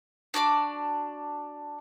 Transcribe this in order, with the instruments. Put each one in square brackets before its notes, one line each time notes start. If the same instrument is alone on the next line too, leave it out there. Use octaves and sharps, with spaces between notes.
[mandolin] D4 F#4 D5 D6